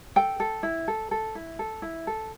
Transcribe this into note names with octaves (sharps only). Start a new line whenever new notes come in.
A4 G5
A4
E4
A4
A4
E4
A4
E4
A4